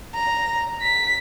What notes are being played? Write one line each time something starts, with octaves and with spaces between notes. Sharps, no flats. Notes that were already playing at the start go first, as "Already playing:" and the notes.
A#5
B6